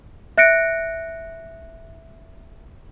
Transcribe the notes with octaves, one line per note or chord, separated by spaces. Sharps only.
E5 F#6 A#6 C#7 D7